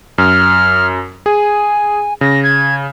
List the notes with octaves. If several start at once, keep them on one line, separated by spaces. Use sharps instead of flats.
F#2 F6
G#4 G#5
C#3 A#6
G#6